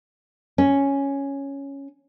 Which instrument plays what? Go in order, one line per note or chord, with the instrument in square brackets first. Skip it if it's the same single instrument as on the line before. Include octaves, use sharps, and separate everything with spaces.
[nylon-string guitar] C#4